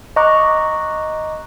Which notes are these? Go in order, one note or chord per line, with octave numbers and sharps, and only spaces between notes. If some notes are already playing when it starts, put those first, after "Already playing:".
D#5 A#5 C#6 D6 F#6